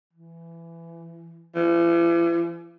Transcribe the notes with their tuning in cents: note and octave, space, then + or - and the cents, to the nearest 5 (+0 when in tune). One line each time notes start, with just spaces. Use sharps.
E3 +20
E3 +45